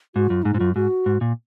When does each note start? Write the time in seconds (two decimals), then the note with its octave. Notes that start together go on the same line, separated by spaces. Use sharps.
0.15 G#2 F#4
0.29 F#2 F4
0.43 G#2 D#4
0.54 G#2
0.57 F#2 F4
0.75 G#2 F#4
1.06 G#2
1.21 A#2